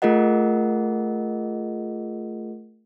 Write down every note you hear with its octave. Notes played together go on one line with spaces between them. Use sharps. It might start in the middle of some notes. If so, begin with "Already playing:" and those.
A3 F4 G#4 A#4 D#5 F#5